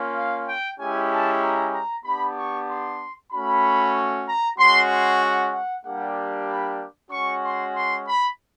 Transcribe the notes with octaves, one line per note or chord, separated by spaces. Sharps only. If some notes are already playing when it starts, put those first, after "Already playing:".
Already playing: A#3 C#4 F4
F5
G5
G#3 C#4 E4 G4 G#5
A5
A#5
A#5
B3 D4 G4 B5
C#6
C6
A3 C#4 F#4 B5
A#5
G#3 C#4 F#4 C6
C6
F#5
F#5
G3 A#3 D4 G4 F#5
B5
G#3 C#4 F#4 C#6
C6
C6
B5